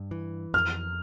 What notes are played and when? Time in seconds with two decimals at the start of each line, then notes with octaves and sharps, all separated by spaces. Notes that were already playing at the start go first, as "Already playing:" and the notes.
Already playing: G2
0.11 E3
0.54 F2 F6